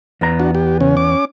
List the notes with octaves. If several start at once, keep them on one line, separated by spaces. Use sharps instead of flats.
E2 B3 A#5
D4 F#4
G4
C#3 C#4
C#4 D6